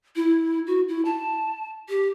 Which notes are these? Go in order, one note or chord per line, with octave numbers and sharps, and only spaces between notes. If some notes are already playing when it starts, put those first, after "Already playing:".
E4
F#4
E4
A5
G4